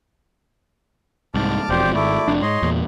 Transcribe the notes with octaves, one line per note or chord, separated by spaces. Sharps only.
C2 G#2 A5 D6 F6
E1 F2 G4 C5 D5
G#1 A3 E4 D5
F1 F2 D4
G#2 C#5 D#5 C6
E2 A#2